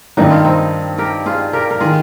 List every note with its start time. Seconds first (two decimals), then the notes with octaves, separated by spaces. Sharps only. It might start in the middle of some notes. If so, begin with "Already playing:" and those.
0.17 G2 D#3 G3 D#4
0.31 F4
0.45 C4 D#4
0.98 G4 A#4
1.26 F4 G#4
1.53 G4 A#4
1.71 A#4
1.80 D#3 F4 G#4